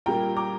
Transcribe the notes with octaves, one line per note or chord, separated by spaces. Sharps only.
A#2 G3 A#3 G5 A#5
A#5 D6